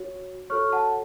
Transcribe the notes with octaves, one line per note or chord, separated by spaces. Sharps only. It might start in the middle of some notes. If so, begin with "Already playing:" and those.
Already playing: F#4 C#5
F#4 A4 C#5 C#6 F6
F#5 A5